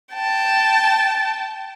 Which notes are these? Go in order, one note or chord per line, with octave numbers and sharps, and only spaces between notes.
G5 A5